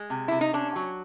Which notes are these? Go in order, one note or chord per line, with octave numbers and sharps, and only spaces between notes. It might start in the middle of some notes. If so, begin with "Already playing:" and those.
Already playing: G#3
C3
C3 E4
D#4
C#4 D4
F#3